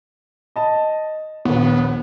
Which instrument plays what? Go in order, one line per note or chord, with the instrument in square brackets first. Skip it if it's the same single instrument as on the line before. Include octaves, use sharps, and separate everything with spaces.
[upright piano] D#5 A5
[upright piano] A#1 D#2 [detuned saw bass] B3